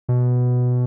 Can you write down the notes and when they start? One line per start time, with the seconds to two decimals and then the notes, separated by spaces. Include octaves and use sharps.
0.09 B2